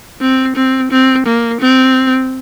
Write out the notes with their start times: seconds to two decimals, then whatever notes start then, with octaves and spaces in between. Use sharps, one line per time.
0.21 C4
0.56 C4
0.91 C4
1.27 A#3
1.61 C4